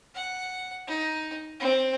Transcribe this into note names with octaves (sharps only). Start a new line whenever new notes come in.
F#5
D#4
C4